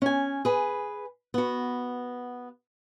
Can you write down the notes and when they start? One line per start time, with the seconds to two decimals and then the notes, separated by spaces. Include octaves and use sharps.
0.02 C#4 G#5
0.45 G#4 B4
1.34 B3 F#4